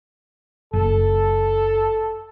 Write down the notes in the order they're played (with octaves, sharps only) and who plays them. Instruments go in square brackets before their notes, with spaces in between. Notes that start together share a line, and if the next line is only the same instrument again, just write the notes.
[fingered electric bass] F#1 [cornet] A4